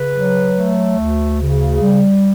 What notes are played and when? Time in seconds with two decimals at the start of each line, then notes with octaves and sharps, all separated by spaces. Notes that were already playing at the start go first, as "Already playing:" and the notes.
Already playing: C#3 B4
0.15 F#3
0.57 A3
0.98 D2
1.41 C#3
1.82 G3